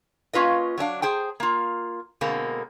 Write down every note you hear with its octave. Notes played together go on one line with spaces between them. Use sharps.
A#3 C#4 F4 B4 D#5
F#3 A3 D4 F5
G#4 C5 G5
A#3 F4
B2 D3 G#3 A#3 C4